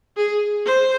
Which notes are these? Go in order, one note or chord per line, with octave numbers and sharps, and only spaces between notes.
G#4
C5